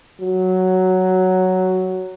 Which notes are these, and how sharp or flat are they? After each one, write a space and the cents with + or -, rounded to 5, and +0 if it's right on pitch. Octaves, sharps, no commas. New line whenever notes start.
F#3 +5